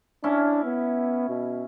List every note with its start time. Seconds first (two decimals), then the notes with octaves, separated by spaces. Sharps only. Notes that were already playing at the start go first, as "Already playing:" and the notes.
0.24 C#4 D4 E4
0.64 B3
1.29 B2